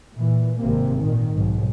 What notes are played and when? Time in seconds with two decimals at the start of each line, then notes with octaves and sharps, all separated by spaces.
0.15 A#2 E3
0.60 G#1 C3 A#3
1.00 A#2 D#3
1.33 B1 G#2